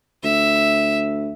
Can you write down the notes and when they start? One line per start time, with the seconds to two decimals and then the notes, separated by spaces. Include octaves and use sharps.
0.24 D2 E5